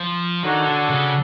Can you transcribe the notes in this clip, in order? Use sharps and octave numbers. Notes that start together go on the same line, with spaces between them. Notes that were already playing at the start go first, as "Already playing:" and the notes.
Already playing: F3
D#3 D4 F#4 A4 C#5
D3
C#3